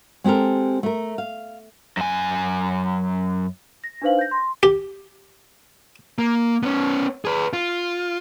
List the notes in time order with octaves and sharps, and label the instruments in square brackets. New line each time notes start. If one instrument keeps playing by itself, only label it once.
[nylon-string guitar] G#3 C4 G4 A4 A#4
A3 A#4
F5
[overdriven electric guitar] F#2 G#5
[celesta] A#6
D4 D#4 B4 C5 F5 F#7
G6 A#6
C6
[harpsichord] G4
[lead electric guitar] A#3
B3 C#4
G#4 B4
F4